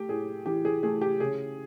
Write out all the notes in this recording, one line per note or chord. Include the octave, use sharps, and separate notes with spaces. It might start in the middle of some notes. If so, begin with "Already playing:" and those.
Already playing: A3 G4
A2 G#4
E3 G4
G#4
A3 G#4
G4
C#3 G#4